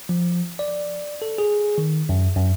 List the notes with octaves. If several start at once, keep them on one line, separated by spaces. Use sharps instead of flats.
F3
D5
A4
G#4
D#3
F#2
F#2